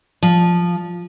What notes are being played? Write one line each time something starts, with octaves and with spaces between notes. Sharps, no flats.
F3